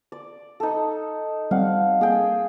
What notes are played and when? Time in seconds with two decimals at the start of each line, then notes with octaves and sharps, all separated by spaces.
0.12 D5
0.60 D#4 A4
1.51 G3 C4 F5 F#5
2.01 A#3 G#4 G5